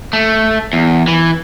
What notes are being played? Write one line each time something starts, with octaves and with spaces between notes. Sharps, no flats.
A3
E2
E3